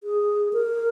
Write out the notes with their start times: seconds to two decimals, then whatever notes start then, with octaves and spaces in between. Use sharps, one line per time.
0.04 G#4
0.53 A#4